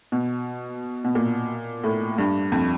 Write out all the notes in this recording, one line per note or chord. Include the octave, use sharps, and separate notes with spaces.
B2
B2
A#2
A2
G2
F2